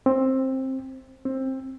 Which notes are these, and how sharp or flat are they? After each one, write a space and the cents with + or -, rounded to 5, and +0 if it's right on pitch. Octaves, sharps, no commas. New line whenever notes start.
C4 +15
C4 +20